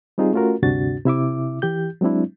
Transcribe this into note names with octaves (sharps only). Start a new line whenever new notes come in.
G3 C4 D#4 F4 G#4
A3 C#4 F4 F#4 A#4
D2 G2 C3 D4 F#4 A6
C3 E4 E5 D6
E3 G4 G6
F#3 G#3 C4 D4 E4